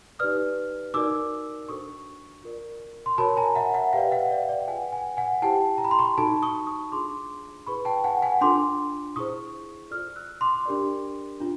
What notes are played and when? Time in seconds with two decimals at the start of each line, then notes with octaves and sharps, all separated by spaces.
0.19 D#4 G4 B4 D5 D#6 F6
0.94 D#4 F#4 A#4 D5 D6 E6
1.69 D4 F#4 A4 C5 C#6 D#6
2.43 F4 A#4 D5
3.06 C6
3.18 F#4 A#4 C#5 A5 B5
3.37 G#5 A#5
3.55 E5 F#5
3.74 E5 F#5
3.93 G4 B4 D5 F5 G5
4.12 E5 F#5
4.25 F5
4.31 D5 E5
4.49 D5
4.61 G5
4.68 F4 G#4 B4 D5 F#5 G#5
4.92 F#5 G#5
5.17 F#5 G#5
5.42 E4 G4 C5 G5 A5
5.78 A#5
5.85 B5
5.91 C6
5.99 B5 C#6
6.18 D#4 F#4 A4 A5 B5
6.42 C#6 D#6
6.67 C#6 D#6
6.92 D4 F4 G#4 C6 D6
7.67 E4 G#4 B4 B5 C#6
7.85 G5 A5
8.04 F#5 G#5
8.22 F#5 G#5
8.41 D4 F4 A4 C6 D6
9.16 E4 G#4 C5 C#6 D#6
9.91 F4 A4 D5 D#6 F6
10.16 E6 F#6
10.41 C6 D6
10.66 D4 G4 A#4 D5
11.40 D4 F4